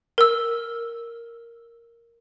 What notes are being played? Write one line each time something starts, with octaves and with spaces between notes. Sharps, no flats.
A#4 E6